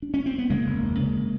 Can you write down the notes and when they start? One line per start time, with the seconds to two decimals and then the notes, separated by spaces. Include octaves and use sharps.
0.02 D4
0.14 C#4
0.26 C4
0.38 B3
0.50 C#3 G#3 A#3
0.66 F1
0.82 D#2
0.99 C#3
1.16 C#3